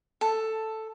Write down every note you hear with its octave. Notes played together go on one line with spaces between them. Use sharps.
A4